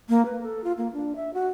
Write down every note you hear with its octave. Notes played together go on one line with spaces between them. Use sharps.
A#3
B4
A4
F4
A#3
D4
E5
F#4